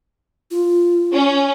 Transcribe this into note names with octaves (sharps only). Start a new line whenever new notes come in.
F4
C#4